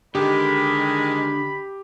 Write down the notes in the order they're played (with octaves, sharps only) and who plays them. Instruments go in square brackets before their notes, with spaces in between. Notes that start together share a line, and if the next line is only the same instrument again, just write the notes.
[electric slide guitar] D3 [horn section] D#3 G#3 [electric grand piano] G4 [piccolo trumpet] B5